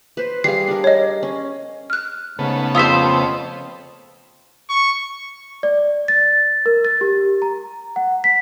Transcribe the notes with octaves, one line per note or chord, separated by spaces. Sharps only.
B4 C5
G3 G#4 F5 C7
D4 A#4
C#5 D#5
C#4
F6 F#6
G#2 C#3 A3 B3
F2 F4 C5 D#6 E6 B6
C#6
D5
A6
A#4
A6
G4
A#5
F#5
B6